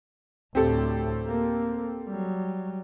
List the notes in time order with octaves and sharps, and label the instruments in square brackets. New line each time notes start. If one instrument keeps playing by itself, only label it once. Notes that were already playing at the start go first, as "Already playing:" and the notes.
[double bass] D2 A2 [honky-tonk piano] C4 G4 A4
[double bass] A#3
F#3 G3